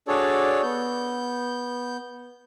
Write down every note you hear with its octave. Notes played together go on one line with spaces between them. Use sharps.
D4 F#4 G#4 A4 C#5 D5
B3 G6